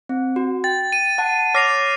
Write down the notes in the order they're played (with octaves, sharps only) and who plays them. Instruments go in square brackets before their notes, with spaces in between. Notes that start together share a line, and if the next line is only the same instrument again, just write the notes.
[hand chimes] C4
F#4
[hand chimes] G5 [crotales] A6
[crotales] D#7
[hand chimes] F#5 A5
[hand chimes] C#5 D6 A#6 [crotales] F6 C7 F7